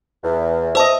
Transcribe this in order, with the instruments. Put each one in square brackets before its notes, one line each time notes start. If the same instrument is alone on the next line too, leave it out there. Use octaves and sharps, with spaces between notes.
[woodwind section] E2
[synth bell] C5 A5 [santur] D#5 E5